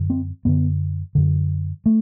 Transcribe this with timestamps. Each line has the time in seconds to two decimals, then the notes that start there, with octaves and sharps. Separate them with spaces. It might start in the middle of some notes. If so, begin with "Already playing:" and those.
Already playing: F#2 D3
0.10 C4
0.45 F#2 D3 B3
1.15 F#2 D3
1.86 A3